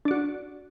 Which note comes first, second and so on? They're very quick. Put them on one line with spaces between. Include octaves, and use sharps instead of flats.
D4 D5 F#4